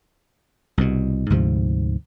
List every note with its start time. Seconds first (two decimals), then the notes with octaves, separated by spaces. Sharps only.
0.78 C2 B2
1.30 D2 G#2 C3 F3